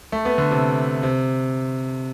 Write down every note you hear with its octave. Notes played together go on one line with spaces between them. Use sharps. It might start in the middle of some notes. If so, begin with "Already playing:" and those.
A3
B3
D3
C3
C3